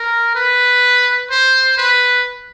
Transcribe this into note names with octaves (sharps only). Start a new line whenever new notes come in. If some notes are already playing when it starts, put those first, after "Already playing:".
Already playing: A#4
B4
C5
B4